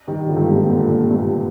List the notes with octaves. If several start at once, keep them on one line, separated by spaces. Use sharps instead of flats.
D#3 G3
D3 F3
G2
G#2
A#2
C3
A#2 D3
C3
G2 A#2